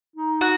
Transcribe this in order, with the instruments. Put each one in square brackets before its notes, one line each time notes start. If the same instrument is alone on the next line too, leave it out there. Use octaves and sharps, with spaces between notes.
[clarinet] D#4
[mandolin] F#4